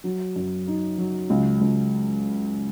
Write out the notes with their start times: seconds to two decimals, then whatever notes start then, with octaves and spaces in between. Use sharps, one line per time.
0.04 F#3
0.36 F#2
0.67 D#4
0.98 F#3
1.30 C#2
1.61 C#2